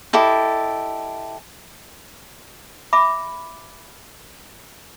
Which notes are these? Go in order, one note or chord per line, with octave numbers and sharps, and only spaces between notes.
E4 G4 A4 D#5
E5 B5 D6